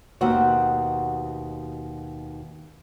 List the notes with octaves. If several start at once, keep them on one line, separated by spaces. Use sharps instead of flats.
D#2 B2 C4 F#4 F#5